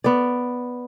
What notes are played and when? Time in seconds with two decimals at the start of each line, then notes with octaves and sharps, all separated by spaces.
0.04 B3 D5